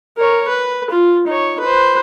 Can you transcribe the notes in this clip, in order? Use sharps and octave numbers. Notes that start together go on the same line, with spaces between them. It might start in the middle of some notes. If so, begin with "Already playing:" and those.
A#4 C#5
B4
F4
D#4 C#5
B4 C5